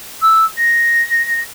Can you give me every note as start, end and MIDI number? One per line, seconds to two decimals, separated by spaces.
0.22 0.44 88
0.57 1.40 94